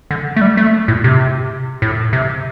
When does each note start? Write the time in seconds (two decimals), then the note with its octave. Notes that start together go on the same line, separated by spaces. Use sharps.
0.11 D3
0.36 A3
0.41 G3
0.57 A3
0.88 A2
1.04 C3
1.82 A2
2.13 C3